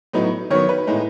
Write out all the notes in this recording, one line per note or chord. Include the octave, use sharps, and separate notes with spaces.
A2 F#3 B3 D#4
D#3 F#3 B3 C#5
B4
A2 G#3 D#4